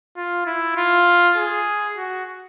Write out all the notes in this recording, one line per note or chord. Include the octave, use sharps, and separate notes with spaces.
F4
E4
F4
G#4
F#4